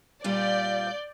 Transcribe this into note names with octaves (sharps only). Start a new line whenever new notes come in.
A#2 G3 F4 D5 G6